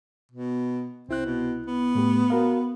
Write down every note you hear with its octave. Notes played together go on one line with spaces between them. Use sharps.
B2
C2 C4 E4 F#6
B2
B3
A2 A3 G4
F#4 A#4 F5